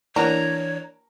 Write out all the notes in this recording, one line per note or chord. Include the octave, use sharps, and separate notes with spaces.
E3 A#3 D4 A#4 C#5 F#5 A#5